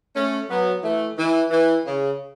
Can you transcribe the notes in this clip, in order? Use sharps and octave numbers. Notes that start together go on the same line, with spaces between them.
A3 C#4
F#3 B3
E3 A3
E3
E3
C#3